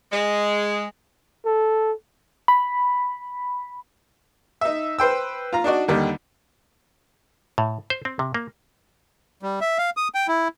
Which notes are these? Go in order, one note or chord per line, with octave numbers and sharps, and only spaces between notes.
G#3
A4
B5
D#4 E5
B4 C5 G5 E6
F4 F5 A#5
D4 D#4 F#4 D5
D#2 D3 D#3 G3
A2
C5
C4
C3
A#3
G3
E5
F5
D#6
G5
E4